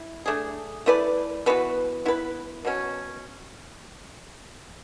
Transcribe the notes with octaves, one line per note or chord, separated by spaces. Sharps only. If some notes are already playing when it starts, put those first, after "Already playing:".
Already playing: E4
A3 D4 G#4
A3 E4 B4 D5
E3 B3 F#4 B4
B3 E4 B4
B2 F#3 C#4